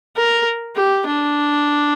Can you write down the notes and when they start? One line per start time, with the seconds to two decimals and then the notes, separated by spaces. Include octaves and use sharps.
0.17 A#4
0.76 G4
1.07 D4